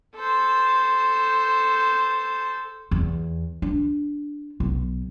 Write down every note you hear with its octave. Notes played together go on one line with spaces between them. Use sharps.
A4 C5
E2
D4
B1